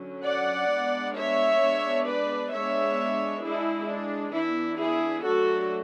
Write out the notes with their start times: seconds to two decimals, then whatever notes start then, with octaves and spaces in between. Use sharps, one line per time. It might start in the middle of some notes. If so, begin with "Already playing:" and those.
Already playing: D3 F#3 C#4
0.25 D5 F#5
0.70 G#3 B3 D4
1.16 C#5 E5
1.61 G#3 B3 D4
2.06 B4 D5
2.52 G#3 B3 D4 C#5 E5
3.43 G#3 D4 E4 G#4
3.89 D4
4.34 E3 B3 D4 E4
4.80 E4 G#4
5.26 F#3 A3 D4 F#4 A4